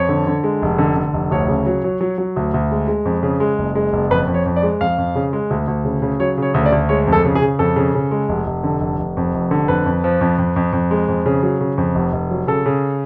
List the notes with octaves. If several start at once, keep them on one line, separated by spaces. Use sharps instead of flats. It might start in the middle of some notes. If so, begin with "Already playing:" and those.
Already playing: F2 C#5
D3
D3
G#3
F1
D3
D3
F1
D2 C#5
C#3
F#3
F#3
F#3
F#3
D2
D2
G#3
G#3
F2
C#3
G#3
F#1
G#3
F#1
F2 B4
F2
C#5
F2
D5
G#3
F2 F5
F2
C#3
G#3
D2
D2
C#3
C#3
F#3 C#5
C#3 C#5
D2
D5
D2
G#3 C#5
F2
A4
C#3
G#4
C#3
F2 A4
C#3
C#3
G#3
F1
F1
D3
F1
F1
F2
F1
D3
F2 B4
F2
F3
F2
F2
F2
F2
G#3
F2
C#3
F#3
C#3
F2
F1
F1
F#3
C#3 A4
C#3